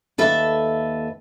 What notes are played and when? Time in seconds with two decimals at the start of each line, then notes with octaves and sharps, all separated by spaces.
0.18 D#2 A4 B4 E5